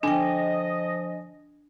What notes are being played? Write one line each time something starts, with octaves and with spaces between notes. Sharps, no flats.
D3 F3 D4 D#5 G5 G#5